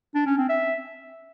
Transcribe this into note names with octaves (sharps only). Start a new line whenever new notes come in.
D4
C#4
C4
E5